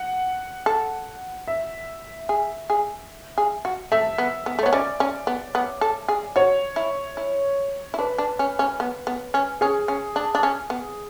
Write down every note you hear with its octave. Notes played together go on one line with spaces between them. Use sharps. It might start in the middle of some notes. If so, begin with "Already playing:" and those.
Already playing: F#5
A4
E5
G#4
G#4
G#4
F#4
A3 E5
B3
B3
A3
B3 C#5
C#4 D5
C#4
B3
B3
A4
G#4
F#4 C#5
E4
E4
E4
D4 B4
D4
C#4
C#4
B3
B3
C#4
C#4 G#4
C#4
D4
D4
C#4
B3